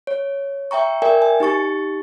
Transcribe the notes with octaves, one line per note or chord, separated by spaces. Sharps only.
C#5
E5 G5 A#5 C#6
A#4 D5 E5 G5 G#5
G#5
D#4 G4 C#6 A6